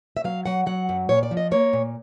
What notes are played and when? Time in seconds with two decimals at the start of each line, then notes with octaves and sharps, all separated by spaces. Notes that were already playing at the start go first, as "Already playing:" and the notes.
0.17 E5
0.24 F#3 F5
0.46 F#3 F#5
0.66 F#3 F#5
0.89 F#2
1.09 A#2 C#5
1.23 D5
1.31 F3
1.37 D#5
1.51 A#3 C#5
1.73 A#2